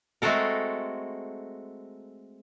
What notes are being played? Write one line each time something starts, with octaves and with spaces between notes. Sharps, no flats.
G#3 A3 C4 F#4 A4 A#4